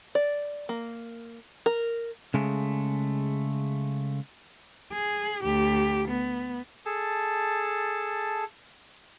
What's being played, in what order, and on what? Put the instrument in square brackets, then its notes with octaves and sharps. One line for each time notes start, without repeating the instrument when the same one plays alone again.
[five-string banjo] D5
A#3
A#4
[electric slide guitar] C#3 G#3 A3
[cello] G#4
D2 G4
B3
[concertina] G#4 A4 A5